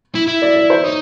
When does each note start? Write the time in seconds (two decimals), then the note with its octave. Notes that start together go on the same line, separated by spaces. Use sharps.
0.15 E4
0.28 E4
0.42 D5
0.56 D5
0.70 C5
0.84 D#4 C#5